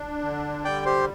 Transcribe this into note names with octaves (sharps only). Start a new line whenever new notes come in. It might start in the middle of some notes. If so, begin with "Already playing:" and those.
Already playing: D4
D3
G3 D5 G5
G4 C5